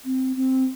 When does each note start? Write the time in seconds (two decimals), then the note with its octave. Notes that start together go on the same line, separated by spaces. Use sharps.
0.05 C4
0.36 C4